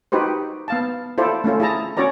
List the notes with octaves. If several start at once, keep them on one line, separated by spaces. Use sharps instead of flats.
D#4 F#4 G4 B4 C5
B3 F5 A5
E4 F4 A4 C5 D5
A3 C#4 F4 A4
E4 G#4 A5 A#5
C#4 F#4 C#5 D5 A#5